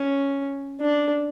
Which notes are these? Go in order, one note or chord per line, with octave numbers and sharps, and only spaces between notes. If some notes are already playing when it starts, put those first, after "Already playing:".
Already playing: C#4
D4